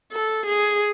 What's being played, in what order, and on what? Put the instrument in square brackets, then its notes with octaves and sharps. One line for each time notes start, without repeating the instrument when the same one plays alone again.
[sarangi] A4
G#4